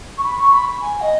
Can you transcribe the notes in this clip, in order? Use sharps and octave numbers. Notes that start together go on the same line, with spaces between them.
C#6
B5
C#6
B5
G#5
D#5